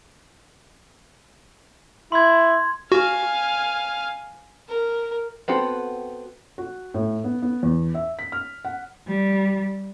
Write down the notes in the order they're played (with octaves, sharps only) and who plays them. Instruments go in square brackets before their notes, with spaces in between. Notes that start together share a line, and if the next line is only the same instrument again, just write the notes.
[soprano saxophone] E4 [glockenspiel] C6 G#6
[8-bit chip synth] F#4 [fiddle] F5 G#5
[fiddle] A#4
[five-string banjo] B3 C4 F#4 A4
[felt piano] F#4
A2
B3
B3
E2
E5
B6
F6
F#5
[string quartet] G3